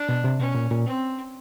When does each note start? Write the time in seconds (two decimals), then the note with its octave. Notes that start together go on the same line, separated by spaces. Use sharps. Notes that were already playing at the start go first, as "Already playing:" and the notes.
Already playing: D4
0.09 B2
0.24 C3
0.39 B2 C#4
0.55 A#2
0.71 A#2
0.86 C4